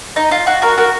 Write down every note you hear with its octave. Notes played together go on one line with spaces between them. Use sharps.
D#4
F4
F#4
F#4 A#4
F#4 A#4